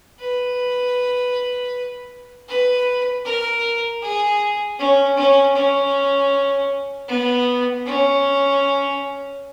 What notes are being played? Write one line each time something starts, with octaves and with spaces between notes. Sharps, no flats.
B4
B4
A#4
G#4
C#4
C#4
C#4
B3
C#4